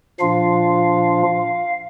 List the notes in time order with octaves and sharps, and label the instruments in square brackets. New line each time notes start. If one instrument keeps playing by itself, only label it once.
[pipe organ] A#2 F3 D4 F4 F5